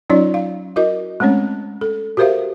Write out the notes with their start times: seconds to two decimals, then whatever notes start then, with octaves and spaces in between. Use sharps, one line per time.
0.10 F#3 C#4 D#4 F4 C#5 D5
0.34 F5
0.76 E4 F#4 A#4 D#5
1.20 G#3 A3 C4 C#4 C#5
1.81 A4
2.17 F#4 G4 A#4 C5 E5 F5